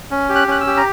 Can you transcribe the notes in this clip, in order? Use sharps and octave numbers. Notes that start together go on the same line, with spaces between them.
C#4
G4
F#6
C#4 F#6
E6
G4
A#5